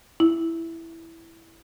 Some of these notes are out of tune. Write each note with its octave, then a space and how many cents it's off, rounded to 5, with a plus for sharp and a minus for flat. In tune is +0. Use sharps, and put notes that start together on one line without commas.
E4 +0